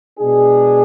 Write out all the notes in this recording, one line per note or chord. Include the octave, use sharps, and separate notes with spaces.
B2 G#3 D4 G#4